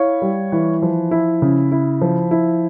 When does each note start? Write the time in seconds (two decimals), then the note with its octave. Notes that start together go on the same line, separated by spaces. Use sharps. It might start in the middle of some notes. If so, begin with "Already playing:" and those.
Already playing: E4 C#5 F5
0.22 G3
0.52 E3
0.82 F3
1.11 E4
1.42 C#3
1.72 E4
2.01 F3
2.31 E4